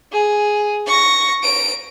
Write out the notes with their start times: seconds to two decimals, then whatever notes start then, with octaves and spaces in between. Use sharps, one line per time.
0.12 G#4
0.87 C#6 A#6
1.43 D7